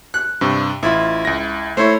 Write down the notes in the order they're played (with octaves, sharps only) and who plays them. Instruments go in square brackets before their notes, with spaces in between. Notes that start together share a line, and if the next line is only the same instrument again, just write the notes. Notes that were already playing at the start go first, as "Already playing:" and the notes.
[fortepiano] F#6
[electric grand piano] G2 C3
[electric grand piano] A1 F4 [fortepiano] E4
[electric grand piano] C#2 A#6
[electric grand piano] A3 E4 [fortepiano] C5 C#5